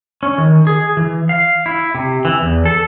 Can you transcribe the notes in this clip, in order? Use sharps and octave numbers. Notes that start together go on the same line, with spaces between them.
C#4
D#3
G#4
E3
F5
E4
C3
E3
E2
A4